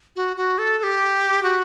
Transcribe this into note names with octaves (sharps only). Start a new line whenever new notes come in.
F#4
F#4
A4
A4
G4
F#4